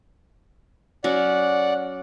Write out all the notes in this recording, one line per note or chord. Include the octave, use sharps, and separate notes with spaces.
F#3 C#4 D5 F#5